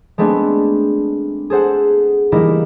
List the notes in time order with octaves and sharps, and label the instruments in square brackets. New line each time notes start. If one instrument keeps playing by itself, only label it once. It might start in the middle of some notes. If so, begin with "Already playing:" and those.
[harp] G#3 A3 B3 C4 D4
G#4 A4 C5 F#5
E3 G3 G#3 A#3 D#4 E4